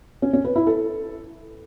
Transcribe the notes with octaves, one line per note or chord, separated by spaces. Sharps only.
C#4
C#4
B4
E4
A4